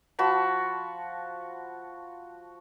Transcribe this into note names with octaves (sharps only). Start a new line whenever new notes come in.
F3 F#4 A5 B5